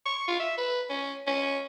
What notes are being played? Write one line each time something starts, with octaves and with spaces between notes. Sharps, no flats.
C#6
F4
E5
B4
C#4
C#4